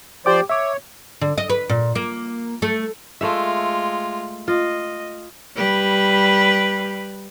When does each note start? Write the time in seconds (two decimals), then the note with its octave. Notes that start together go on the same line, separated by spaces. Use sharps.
0.26 F3 G4 C5 D5 G5 D6
0.49 C#5 E5 D6
1.21 D3
1.38 D#5
1.50 B4
1.69 A#2
1.95 A#3
2.62 A3
3.21 G#3 A3 F4 E5
4.48 F4 D#5
5.56 G3 B4